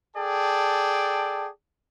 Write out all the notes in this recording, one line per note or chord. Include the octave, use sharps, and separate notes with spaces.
G#4 A4 D5 G5 A5